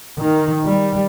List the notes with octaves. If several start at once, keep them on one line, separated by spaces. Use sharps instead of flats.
D#3
G3